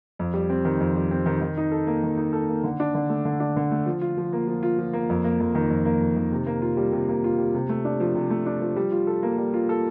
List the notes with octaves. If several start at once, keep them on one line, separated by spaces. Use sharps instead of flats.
F2
G3
C4
D#3
F2
G3
C4
D#3
D#3
D#4
A4
A#3
D#3
D#4
A4
A#3
D3
D4
D3
A3
D3
D4
D3
A3
F3
F4
F3
A#3
F3
F4
F3
A#3
F2
A#3
F2
D#3
F2
A#3
F2
D#3
C3
A#3
F4
G3
C3
A#3
F4
G3
C3
A3
D4
F3
C3
A3
D4
F3
G3
F4
A4
A#3
G3
F4
A4